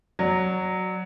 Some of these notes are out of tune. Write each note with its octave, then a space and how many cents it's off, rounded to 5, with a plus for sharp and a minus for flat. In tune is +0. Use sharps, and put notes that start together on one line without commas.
F#3 +0 D5 +20